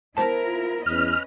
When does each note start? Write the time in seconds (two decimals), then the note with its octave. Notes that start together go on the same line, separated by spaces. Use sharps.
0.17 B3 E4 A#4 C5 A5
0.45 F4
0.86 E2 C#4 B4 D#5 F6